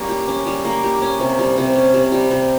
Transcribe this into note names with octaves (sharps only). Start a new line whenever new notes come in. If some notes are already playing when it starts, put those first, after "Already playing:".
Already playing: G3 A#3 C#4
G4
C#4
G3
A#3
G4
C#4
C3
G3
C3
C#4
C3
G3
C3